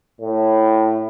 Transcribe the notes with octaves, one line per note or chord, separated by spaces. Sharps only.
A2